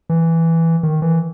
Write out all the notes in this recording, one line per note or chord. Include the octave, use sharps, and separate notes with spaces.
E3
D#3
E3